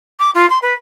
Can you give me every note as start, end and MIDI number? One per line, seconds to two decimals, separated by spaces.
0.19 0.31 86
0.35 0.48 65
0.50 0.59 84
0.62 0.73 71